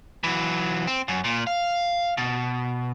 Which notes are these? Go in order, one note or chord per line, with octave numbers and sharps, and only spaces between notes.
E3 F#3
C4
F#2
A#2
F5
B2